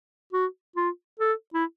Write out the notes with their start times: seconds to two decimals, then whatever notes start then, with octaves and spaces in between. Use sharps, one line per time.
0.33 F#4
0.76 F4
1.19 A4
1.54 E4